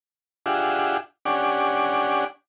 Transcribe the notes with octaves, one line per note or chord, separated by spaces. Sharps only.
D4 F4 G4 G#4 E5 F#5
C#4 D4 G4 D5 F#5 G#5